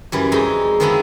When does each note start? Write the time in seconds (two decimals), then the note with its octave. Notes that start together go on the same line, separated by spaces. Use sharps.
0.12 F#2 E3 G3
0.32 F2 G#3 D#4
0.80 D#3 F3 G#3 B3 D4 E4